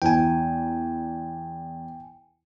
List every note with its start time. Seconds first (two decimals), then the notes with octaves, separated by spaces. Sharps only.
0.02 E2 G5 G#5